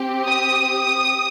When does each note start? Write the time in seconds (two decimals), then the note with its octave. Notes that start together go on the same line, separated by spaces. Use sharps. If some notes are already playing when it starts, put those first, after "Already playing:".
Already playing: C4 G4
0.27 D#6